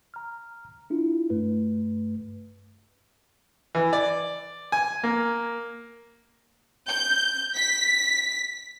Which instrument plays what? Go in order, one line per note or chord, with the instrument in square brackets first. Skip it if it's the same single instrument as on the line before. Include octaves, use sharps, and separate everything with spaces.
[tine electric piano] A#5 F6
D4 E4 F4
G2 A3 B4
[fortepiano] E3
D5
G#5
A#3
[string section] G6
B6